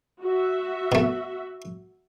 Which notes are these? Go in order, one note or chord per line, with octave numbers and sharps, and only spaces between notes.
F#4 E5
B2 A3